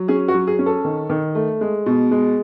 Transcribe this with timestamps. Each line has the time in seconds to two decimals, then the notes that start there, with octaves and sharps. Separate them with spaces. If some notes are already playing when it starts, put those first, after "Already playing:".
Already playing: F#3
0.08 C#4 G#4
0.28 F#4
0.34 F#3
0.47 G#4
0.59 C#4
0.66 A4
0.85 D#3
1.10 D#3
1.35 A3
1.61 G#3
1.86 B2
2.11 G#3